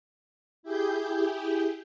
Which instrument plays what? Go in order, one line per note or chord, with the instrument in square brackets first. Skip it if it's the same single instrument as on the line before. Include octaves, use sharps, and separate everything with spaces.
[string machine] E4 G4 G#4 G6